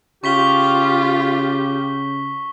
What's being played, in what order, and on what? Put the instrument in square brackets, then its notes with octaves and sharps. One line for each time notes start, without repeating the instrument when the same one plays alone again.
[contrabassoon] C#3 [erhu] F4 [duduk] G4 [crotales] C#6 B6 G7